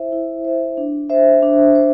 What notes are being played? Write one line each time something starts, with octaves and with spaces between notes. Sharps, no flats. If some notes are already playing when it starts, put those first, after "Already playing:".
Already playing: E4 C5 E5
E4
C5 E5
D4
C5 E5
D4
C5